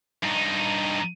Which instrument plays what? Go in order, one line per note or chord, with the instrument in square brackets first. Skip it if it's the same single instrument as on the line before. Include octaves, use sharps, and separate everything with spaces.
[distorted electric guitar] G2 D#4